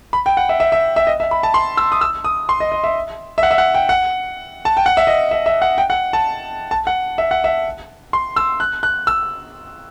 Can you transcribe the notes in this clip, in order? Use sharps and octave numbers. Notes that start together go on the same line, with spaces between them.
B5
G5
F#5
E5
E5
E5
E5
D#5
E5
B5
A5
C6
E6
D#6
E6
D#6
C6
D#5
D#5
E5
E5
F#5
E5
F#5
G5
F#5
A5
G5
F#5
E5
D#5
E5
E5
F#5
G5
F#5
A5
A5
F#5
E5
F#5
E5
C6
E6
F#6
F#6
E6